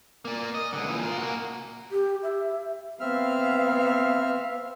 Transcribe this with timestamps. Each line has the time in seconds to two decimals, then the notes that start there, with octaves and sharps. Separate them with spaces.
0.25 A#3 D5
0.54 D#5
0.73 C#2 D3
0.88 A#2 E3
1.03 F4 A#4
1.18 A#3 F#4
1.92 G4
2.23 E5
3.00 B3 C4 E5 F5 F6